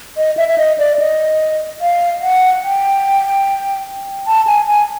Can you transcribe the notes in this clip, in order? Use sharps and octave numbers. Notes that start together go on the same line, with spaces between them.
D#5
E5
E5
D#5
D5
D#5
F5
F#5
G5
A5
G#5
G#5